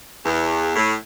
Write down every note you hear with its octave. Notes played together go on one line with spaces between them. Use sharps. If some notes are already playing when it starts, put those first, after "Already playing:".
E2
A2